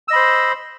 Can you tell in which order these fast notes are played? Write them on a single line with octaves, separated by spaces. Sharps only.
E6 D#5 B5 C5